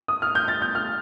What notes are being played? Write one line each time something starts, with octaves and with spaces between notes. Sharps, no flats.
D#6
F6
G6
A6
G6
F6